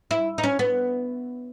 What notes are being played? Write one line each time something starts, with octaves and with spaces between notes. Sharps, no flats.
E4
D#4
C#4
B3